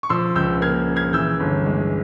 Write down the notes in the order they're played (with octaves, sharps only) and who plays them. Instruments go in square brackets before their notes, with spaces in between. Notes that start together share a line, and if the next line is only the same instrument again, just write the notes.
[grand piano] C#6
F3 C6 E6
C#2 E6 G6
A#3 F6 G#6
C#3
F6 G#6
E3 E6 G6
G1
G#3